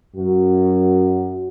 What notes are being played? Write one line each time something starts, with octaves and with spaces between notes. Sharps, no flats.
F#2 F#4